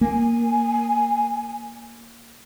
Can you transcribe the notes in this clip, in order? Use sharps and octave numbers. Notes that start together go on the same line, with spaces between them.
A#3 G#5